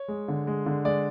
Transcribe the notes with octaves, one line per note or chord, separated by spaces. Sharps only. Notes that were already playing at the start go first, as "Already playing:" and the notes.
Already playing: C#5
G#3
D3
G#3
D3
G#3 D5